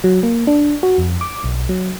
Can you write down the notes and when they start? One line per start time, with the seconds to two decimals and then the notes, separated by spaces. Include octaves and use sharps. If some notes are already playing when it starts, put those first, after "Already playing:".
0.04 F#3
0.23 A#3
0.47 D4
0.83 F#4
0.98 F2
1.21 D6
1.44 B1
1.69 F#3